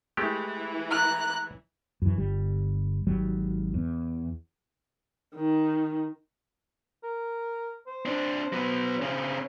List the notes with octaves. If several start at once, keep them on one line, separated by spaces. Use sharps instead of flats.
E3 G#3 A3 G4
A#5 F#6
F#2 E3
G1 G3
G#1 F#3 G3
E2
D#3
A#4
C5
C4 D4
F#3 B3
C#3 C4